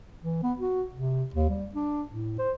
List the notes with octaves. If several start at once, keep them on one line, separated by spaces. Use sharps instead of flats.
E3
B3
F#4
C3
D#2
G3
D4
A2
C5